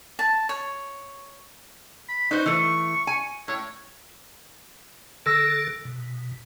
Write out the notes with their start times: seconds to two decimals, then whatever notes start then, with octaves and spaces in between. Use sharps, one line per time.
0.19 A5
0.49 C#5
2.09 B5
2.31 D#4 F#4 B4 C5
2.46 E3 A3 C#6
3.07 G#5
3.48 A2 C#5
5.26 D3 A4 E6 A#6
5.85 B2